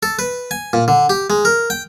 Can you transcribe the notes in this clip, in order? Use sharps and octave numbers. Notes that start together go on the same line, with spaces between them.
A4
B4
G#5
A#2
D3
G4
G#3
A#4
G5